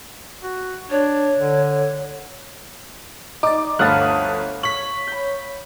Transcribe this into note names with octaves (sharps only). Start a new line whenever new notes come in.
F#4
D4 C#5
D3
D#4 D5 D6
G1 D2 F5 F#5 A5 B5 D#6 F#6
C#5 B6 F#7
B5 G6